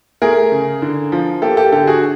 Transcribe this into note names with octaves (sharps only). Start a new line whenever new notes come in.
A3 G#4 A#4
C#3
D3
F3
A#3 G4 A4
G4 A4
D3 G4 A4
F#4 G#4